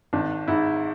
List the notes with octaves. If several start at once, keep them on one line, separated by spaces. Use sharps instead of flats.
G#1 D4
G#2 E4